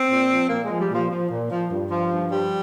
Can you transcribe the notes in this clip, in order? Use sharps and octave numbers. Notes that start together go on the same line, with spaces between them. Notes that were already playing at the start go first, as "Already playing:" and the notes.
Already playing: C4
A#2
F3
A#2 A#3
G#3
F3
G3
A#2 F3
F3
A#2
F3
G2
F3
G2
F3 G3